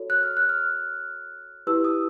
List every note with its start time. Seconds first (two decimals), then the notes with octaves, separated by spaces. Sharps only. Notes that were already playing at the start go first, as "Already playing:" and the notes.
Already playing: F#4 A4 C#5
0.10 F#6
0.23 F6
0.37 F#6
0.49 F6
1.67 E4 G4 B4 E6
1.84 D#6